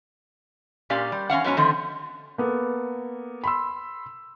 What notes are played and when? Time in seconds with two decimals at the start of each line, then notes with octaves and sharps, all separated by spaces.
0.90 A#2 C#4 G4 D5 F5
1.12 G3
1.30 E2 C#4 F5 F#5
1.44 G#2 F#3 B3 C#4 A#5
1.57 D3 D#3 F3 A3 C4
2.38 A#3 B3 A4
3.44 B5 C6 E6